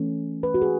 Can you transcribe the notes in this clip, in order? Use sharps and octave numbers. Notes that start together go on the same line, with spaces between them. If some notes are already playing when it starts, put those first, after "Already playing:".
Already playing: E3 A3 C#4
B4
F#4
G#4